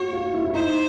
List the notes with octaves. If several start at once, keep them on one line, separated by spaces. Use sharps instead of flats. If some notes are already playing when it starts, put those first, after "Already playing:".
Already playing: F4 F#4 C#5
F4
E4
E4
D#4 C5